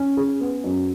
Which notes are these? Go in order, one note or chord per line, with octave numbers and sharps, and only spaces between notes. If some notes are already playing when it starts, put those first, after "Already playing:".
Already playing: C#4
G#4
B3
F#2